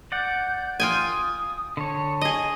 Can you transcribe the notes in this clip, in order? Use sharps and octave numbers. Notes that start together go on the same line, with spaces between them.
D5 F#5 G6
F4 G5 G#5 D#6
D3 C#5 A5
G#4 D#5